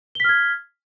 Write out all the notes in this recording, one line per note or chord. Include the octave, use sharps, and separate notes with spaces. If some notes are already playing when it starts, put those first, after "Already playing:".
F6 G#6 B6 G7